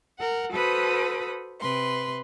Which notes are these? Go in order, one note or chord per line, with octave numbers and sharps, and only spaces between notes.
A#4 F#5
F#4 A4 B4 C5 B5 D#6
C3 B4 C6